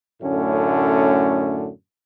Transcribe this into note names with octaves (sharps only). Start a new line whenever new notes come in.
F#2 A2 D3 A3 C#4